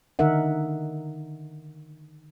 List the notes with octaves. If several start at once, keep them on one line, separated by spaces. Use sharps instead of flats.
D3 D#3 D#4 A#4 E5 F#5